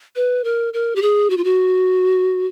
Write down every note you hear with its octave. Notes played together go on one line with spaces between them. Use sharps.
B4
A#4
A#4
G4
G#4
F#4
F4
F#4